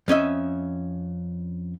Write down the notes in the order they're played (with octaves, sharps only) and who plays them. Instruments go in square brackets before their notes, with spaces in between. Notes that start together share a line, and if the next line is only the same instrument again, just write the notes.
[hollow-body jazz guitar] F2 C#4 D#5 E5